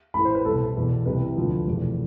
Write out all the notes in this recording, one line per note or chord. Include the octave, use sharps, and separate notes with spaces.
A1 A2 E3 B5
C5
B4
C2 B2 A4
E2 B2
C2 C3 E3 B4
D2 D3 F3
F1 E2 B2